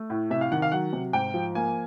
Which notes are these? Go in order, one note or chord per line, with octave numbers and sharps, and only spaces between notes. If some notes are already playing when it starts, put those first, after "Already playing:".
Already playing: A3
A2
C3 E5
F5
D#3 F#5
F5
F#3 F#5
C3
G#2 G5
F3
A#3 G#5